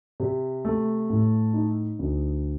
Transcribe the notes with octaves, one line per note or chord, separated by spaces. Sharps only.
C3
A3
A2
D#4
D2